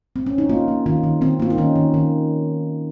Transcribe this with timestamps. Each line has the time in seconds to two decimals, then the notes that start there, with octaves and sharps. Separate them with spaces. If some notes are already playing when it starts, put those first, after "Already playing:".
0.16 C4
0.26 C#4
0.38 D#4
0.49 A#3 F4
0.68 A#3
0.86 D#3 F4
1.04 D#3
1.21 D#3 C4
1.40 A#3 F4
1.50 D#4
1.58 D#3 C#4
1.76 D#3
1.94 D#3